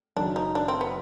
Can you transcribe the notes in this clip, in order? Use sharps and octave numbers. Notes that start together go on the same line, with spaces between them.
F#1 F#2 D#3 F#3 D4
D#4
D4
C4
B3